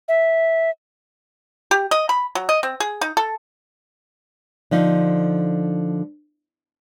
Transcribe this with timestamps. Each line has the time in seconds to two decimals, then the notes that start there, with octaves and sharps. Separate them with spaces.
0.08 E5
1.71 G4
1.91 D#5
2.09 B5
2.35 F#3
2.49 D#5
2.63 C4
2.80 G#4
3.01 D#4
3.17 A4
4.71 D3 F3 D#4